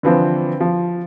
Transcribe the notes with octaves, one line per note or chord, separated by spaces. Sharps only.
D3 E3 F3 C4
F3